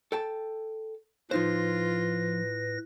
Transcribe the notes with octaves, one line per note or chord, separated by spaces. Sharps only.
A4 G5 A5
A2 F3 D#4 F4 B4 C5 A#6